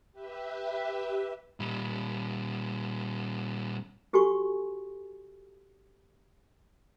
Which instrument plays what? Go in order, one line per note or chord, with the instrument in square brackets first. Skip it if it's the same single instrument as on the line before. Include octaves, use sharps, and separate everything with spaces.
[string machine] G4 B4 E5
[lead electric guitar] A#2 G3
[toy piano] F#4 G4 A4 G#5 C6 C#6